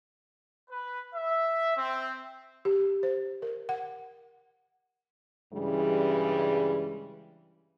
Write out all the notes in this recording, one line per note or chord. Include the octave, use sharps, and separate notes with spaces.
B4
E5
C4
G4
C5
A#4
F#5
G2 C#3 E3 G3 G#3